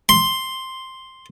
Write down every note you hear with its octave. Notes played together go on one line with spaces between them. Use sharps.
C6